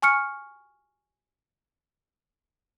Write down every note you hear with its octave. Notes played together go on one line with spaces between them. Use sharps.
G#5 C#6 F6 C#7